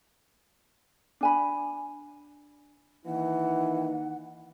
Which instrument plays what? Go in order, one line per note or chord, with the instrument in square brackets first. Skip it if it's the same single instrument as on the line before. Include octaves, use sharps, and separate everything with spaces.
[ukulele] D4 G#5 B5
[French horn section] D#3 A#3 D#4 [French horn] E3 [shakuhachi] F#5